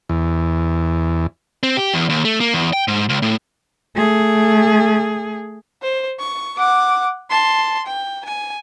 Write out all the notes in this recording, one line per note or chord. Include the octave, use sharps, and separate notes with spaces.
E2
C4
G4
E2
D#2
A3
A#3
E2
G5
G#2
C#2
A2
A3 G#4
C5
C#6
F#5 D6
A5 C6
G5
G#5